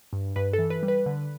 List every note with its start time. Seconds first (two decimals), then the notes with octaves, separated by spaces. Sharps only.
0.13 G2
0.36 G2 B4
0.53 A4
0.59 E3
0.70 B4
0.83 G3
0.88 B4
1.06 D3